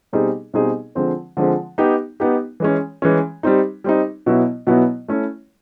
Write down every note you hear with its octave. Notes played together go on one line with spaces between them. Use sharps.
B2 G3 C4 D#4 G#4
B2 G3 C4 D#4 G#4
D3 F3 G#3 C4
D3 F3 G#3 C4
B3 D#4 G4
B3 D#4 G4
E3 G#3 C#4
E3 G#3 C#4
G3 C4 D#4
G3 C4 D#4
B2 F#3 B3 E4
B2 F#3 B3 E4
A3 C#4 E4